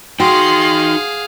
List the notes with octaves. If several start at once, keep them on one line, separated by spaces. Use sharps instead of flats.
D#4 F#4 G#4 F5 G5 C6